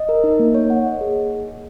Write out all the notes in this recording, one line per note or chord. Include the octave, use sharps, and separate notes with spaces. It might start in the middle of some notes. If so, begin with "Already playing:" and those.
Already playing: D#5
A#4
D#4
A#3
C#5
F#5
D#5
G#4